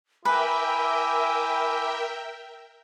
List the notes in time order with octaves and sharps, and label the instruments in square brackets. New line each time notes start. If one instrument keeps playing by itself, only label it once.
[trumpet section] E4 D6 [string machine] A#4 E5 G5 [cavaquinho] B4 [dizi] G#5